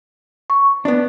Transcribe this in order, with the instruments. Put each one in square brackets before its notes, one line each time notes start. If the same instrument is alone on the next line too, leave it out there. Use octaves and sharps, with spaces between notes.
[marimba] C#6
[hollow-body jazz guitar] B3 D4